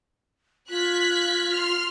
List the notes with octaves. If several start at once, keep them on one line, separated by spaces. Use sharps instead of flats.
F4 F#6 G#6 B6
C6 F6